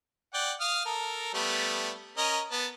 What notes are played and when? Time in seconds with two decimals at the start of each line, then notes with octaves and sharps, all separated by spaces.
0.34 D5 F#5 G5
0.61 F5 D#6 F6
0.86 A4 A#4
1.34 G3 A3 B3
2.17 C#4 A#4 D#5
2.52 B3 A5